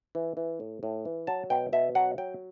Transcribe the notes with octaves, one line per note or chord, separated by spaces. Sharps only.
E3
E3
A2
A2
E3
F#3 A5
B2 G5
B2 E5
F#3 F#5
F#3 G5